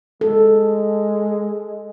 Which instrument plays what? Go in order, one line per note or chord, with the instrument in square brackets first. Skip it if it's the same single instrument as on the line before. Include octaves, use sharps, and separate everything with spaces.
[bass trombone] G#3 [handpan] A4